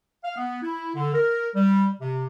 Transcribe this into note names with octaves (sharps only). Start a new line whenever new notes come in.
F5
B3
E4
D3
A#4
G3
C3